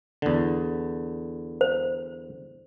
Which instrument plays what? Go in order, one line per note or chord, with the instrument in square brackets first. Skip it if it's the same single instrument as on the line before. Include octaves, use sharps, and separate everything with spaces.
[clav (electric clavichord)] E2 D3
[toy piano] C5